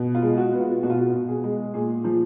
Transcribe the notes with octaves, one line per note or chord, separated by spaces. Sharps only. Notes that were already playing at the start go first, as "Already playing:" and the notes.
Already playing: B2
F4
G#3
F#4
B3
F4
B2 F#4
F4
F#4
B2
G#4
G#3
A#2 G#4
F3